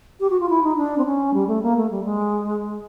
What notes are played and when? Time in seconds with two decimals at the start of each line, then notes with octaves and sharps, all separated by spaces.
0.20 G4
0.30 F#4
0.40 F4
0.49 E4
0.63 D#4
0.77 D4
0.98 C4
1.06 C#4
1.34 G3
1.48 A3
1.63 A#3
1.77 A3
1.91 G3
2.04 G#3